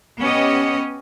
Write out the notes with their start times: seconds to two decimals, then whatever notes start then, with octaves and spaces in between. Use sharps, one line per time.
0.20 B3 C#4 G4 C#5 D#5